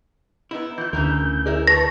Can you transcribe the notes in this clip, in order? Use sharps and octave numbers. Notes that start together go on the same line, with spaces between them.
B3 D#4 E4
E3 F4 G6
D2 C#3 E3 A#4
E4 G#4 A#4 D5
B4 A5 C#6 A#6